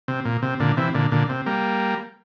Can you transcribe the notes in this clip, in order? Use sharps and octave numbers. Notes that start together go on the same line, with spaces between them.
C3
A#2
C3
A#2 D3
C3 E3
A#2 D3
A#2 D3
C3
G3 A#3